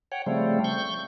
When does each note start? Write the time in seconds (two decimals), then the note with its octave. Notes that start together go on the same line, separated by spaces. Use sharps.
0.12 C#5 F#5 G5
0.26 C#3 F3 G3 A3 C4
0.64 C#6 G6